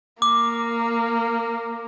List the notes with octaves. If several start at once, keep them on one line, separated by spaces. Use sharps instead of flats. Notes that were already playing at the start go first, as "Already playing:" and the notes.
A#3 D6